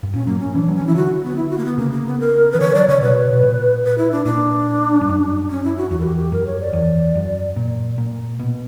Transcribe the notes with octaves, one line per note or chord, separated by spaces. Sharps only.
G2
A#2 C#4
F#3 A#3
C#4
E3 D4
F#3
C#4
E3
E4
D3 F#4
B3
E4
F#4
A#3
B3
C#3 A#3
A#3
B3
A#4
E3 B4
D3 C#5
F#3 D5
C#3 C#5
B2 B4
B2
A#2
B4
E4
D4
A#2 D4
G2
F#2
C#4
E4
F#4
E2 F#4
A#4
G4
G4
F#2 A#4
C#5
D5
E2
F#2
A#2
A#2
B2